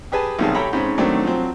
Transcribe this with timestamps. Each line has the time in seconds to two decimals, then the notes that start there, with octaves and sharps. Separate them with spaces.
0.12 G4 G#4 B4 G#5 A5
0.39 B1 C3 D#3 G3 G#4 A5
0.54 G4 A4 C#5 G5 A#5 B5
0.73 G#2 C4 C#4 B5
0.98 D#3 F#3 A3 C4 D4
1.23 F3 F#3 C4